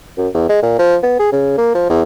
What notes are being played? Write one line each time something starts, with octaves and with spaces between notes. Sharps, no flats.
F#2
E2
G#3
A#2
F3
B3
G#4
C#3
A#3
F3
E2